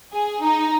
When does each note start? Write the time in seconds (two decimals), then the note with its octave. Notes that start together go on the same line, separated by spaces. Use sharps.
0.13 G#4
0.41 D#4